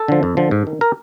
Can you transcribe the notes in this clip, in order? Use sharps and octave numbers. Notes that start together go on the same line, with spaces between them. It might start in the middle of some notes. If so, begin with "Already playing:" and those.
Already playing: A4
D3 F3
F2
D3 F3
G#2
D#3
A#4